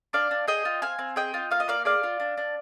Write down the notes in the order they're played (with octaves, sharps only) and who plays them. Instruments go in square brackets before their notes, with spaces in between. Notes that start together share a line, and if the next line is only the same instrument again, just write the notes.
[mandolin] D4 D5 F5
D4
G#4 D#5 G5
F4
C4 F5 G#5
C4
G#4 D#5 G5
F4
A#3 F5
D#5
A#3 D5 F5
G#4 D5 F5
F4
D4
D4